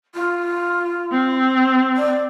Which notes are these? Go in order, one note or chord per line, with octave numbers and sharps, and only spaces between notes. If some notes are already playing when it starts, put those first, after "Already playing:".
F4
C4
D5